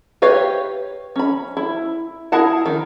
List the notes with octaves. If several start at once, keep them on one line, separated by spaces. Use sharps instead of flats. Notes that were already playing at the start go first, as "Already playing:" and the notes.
G4 B4 C#5 F5
C#4 B5
E4
E4 G#4 A#4 F#5 A5
D#3